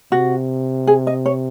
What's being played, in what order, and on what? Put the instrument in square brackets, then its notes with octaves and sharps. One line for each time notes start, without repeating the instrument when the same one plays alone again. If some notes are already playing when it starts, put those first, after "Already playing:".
[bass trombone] C3 [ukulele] F#4
[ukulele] G#4
D#5
C#5